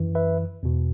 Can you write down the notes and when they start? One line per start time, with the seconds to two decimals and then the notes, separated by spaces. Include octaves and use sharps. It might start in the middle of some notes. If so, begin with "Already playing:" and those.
Already playing: F#2 E3
0.15 B4 E5
0.63 E2 B2